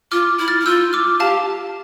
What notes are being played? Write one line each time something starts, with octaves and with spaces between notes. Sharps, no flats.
F4 D6 F6
E4
F6 A6
E4
F4 E6 G6
D6 F6
G4 F5 A5